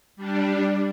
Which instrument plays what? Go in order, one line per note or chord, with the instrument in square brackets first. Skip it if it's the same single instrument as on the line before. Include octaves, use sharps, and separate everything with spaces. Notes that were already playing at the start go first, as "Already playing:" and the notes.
[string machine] G3 D4